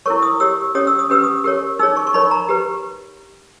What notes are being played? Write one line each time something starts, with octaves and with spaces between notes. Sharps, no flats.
E4 A#4 C#5 C#6
D#6
G4 C#5 E6
C#4 G4 C#5 D#6
E6
D#6
C#4 G4 B4 E6
D#6
G4 A#4 C#5
D#4 G#4 C#5 E6
C#6
C#6
D#4 A#4 C#5 B5
A#5
G4 B4